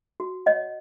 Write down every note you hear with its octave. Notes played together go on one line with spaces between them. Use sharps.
F#4
C#5 D#5 F#5